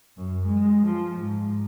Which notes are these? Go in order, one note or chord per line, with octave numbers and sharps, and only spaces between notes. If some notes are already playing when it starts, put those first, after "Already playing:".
F#2
G#3
F3
G#2